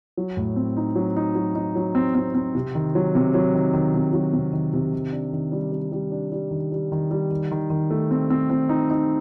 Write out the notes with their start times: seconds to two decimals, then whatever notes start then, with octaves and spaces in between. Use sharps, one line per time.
0.17 F#3
0.37 A2
0.56 C4
0.77 D#4
0.96 F#3
1.17 D#4
1.35 F#3
1.55 D#4
1.75 F#3
1.95 C4
2.15 C4
2.35 C4
2.55 C3
2.75 D#3
2.95 F#3
3.15 C3
3.34 F#3
3.55 D#3
3.73 D#3
3.94 C3
4.13 F#3
4.33 C3
4.53 D#3
4.73 C3
4.93 D#3
5.12 D4
5.32 D#3
5.52 G3
5.72 G3
5.92 G3
6.11 D4
6.32 G3
6.51 D#3
6.72 G3
6.92 D#3
7.11 G3
7.31 D#3
7.51 D#3
7.70 D#3
7.90 A3
8.11 C4
8.30 C4
8.50 C4
8.69 D#4
8.90 D#4